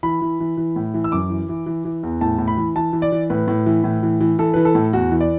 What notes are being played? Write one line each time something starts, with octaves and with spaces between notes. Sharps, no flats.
E3 B5
E3
E3
E3
A2
E3
E6
F#2 D6
E3
E3
E3
E3
E2
A2 A5
A2
B5
E3
E3 A5
E3
D5
E3
A2 B4
A2
E3
A2
E3
E3
E3 A4
E3 B4
A4
A2
E2 F#4
E3
D5